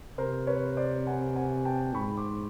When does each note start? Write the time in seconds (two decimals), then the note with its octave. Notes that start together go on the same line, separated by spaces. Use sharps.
0.17 C3 A#4 C5
0.47 B4 C#5
0.77 C5 D5
1.07 F#5 G#5
1.36 F#5 G#5
1.65 G5 A5
1.95 G#2 B5 C#6
2.17 C6 D6